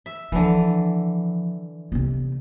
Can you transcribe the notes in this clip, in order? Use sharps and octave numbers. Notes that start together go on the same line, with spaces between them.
E5
D3 E3 F3
C3 B3